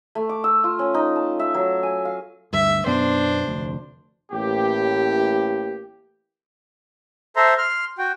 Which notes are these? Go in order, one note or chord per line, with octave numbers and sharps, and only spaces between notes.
A3
D6
E6
F4
C#4
D#4
A5
E5
F#3
G#5
F5
D2 G2 E5
F#2 B2 B3 D4 C5
F1 D2
A1 A2 E3 A#3 G4
A4 C5 E5 A#5 C6
C6 F6
F#4 G5